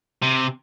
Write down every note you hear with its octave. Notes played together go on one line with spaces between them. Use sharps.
C3